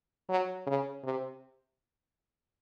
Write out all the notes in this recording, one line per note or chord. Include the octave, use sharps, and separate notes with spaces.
F#3
C#3
C3